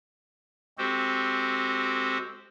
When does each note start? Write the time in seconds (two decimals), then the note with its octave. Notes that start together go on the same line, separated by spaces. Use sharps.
0.78 G#3 C4 F#4 G4 A4 C5